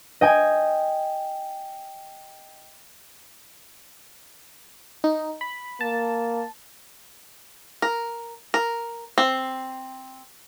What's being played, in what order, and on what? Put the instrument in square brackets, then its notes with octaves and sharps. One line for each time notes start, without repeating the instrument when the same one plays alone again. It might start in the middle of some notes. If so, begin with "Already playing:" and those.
[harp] D#5 G5 G#5
[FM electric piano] D#4
B5
[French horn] A#3 [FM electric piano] A5
[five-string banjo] A#4
A#4
C4